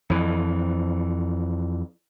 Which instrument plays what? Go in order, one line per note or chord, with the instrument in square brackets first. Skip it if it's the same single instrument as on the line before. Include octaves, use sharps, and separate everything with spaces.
[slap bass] F2 E3